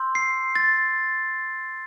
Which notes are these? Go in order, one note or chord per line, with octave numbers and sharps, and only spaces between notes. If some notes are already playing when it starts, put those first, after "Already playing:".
Already playing: C6 E6 G6
C7
A6